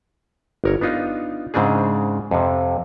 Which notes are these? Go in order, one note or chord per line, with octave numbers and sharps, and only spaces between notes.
G1 A#4 C#5
B3 D4 D#4 F4
G#2 C#3 C4 D4 G#4
F2 C3